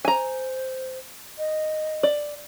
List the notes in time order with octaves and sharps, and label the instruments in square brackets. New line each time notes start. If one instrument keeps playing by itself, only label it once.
[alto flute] C5 [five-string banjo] G#5 A#5
[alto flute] D#5
[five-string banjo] D5